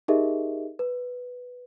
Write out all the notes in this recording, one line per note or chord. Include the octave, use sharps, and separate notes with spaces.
D#4 G4 G#4 A#4 D#5 E5
B4